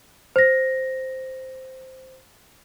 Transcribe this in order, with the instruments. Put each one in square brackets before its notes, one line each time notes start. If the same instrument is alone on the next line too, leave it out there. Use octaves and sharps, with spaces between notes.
[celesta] C5 A#6